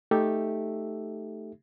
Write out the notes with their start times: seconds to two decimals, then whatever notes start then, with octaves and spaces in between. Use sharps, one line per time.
0.11 A3 D#4 G4 A4 E5